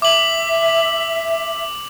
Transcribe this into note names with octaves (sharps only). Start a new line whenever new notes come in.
E5 D6 F#7